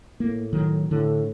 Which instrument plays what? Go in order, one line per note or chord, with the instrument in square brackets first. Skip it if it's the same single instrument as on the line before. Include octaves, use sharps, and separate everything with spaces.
[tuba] A2 [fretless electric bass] A#3
[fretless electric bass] D#3 F#3
[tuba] A2 [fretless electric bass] D3